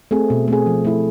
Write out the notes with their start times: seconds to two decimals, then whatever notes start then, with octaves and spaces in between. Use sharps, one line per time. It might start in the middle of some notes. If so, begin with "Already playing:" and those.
0.11 A3 C4 G#4
0.30 B2
0.48 A3 C4 G#4
0.66 F3
0.85 A3 E4